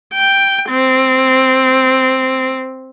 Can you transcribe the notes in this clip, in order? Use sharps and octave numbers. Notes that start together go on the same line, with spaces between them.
G5
C4